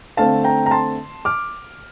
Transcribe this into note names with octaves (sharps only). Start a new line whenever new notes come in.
D3 A3 C4 F5 A5
G5 A#5
A#5
A5 C6
D6 F6